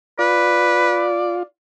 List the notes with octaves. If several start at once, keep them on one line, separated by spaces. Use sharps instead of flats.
F4 B4 D5